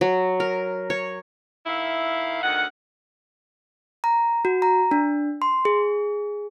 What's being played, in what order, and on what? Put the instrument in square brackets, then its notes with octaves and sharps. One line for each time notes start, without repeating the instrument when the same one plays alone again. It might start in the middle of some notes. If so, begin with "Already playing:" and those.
[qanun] F#3
A#4
C#5
[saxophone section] D#3 E4 E5 F5
D2 D#3 F#5
[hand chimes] A#5
F#4
A#5
D4
C6
G#4